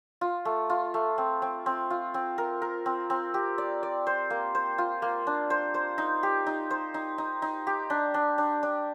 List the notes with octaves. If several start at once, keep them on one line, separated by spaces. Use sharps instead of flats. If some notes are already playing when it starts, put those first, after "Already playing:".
F4
A3
F4
A3
C4
C4
C4
F4
C4
A#4
A#4
C4
C4
G4
D5
D5
C5
A#3
C5
F4
A#3
D4
C5
C5
D#4
G4
D#4
C5
D#4
D#4
D#4
G4
D4
D4
D4
D4